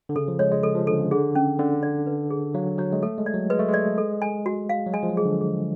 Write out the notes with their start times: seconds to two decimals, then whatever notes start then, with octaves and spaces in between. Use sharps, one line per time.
0.09 D3
0.16 C#3 A4
0.28 F3
0.39 G#3 C#5
0.51 G#3
0.63 A4
0.75 F3
0.87 D3 A4
0.99 C#3
1.11 D3 G#4
1.35 C#4
1.59 D3 C#4
1.83 D5
2.07 B4
2.31 G#4
2.54 F#3 F5
2.79 F#3 C#5
2.92 G#3
3.02 A3 A4
3.18 G#3
3.26 D5
3.34 F#3
3.50 G#3 B4
3.59 A3
3.69 G#3
3.74 D5
3.98 A4
4.22 G#5
4.46 F#4
4.69 F5
4.86 F#3
4.93 G#3 G#5
5.03 F3
5.09 F#3
5.17 G#4
5.25 D3
5.41 G#4